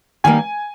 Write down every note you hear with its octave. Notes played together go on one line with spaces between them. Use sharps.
D#3 G3 A#3 G#5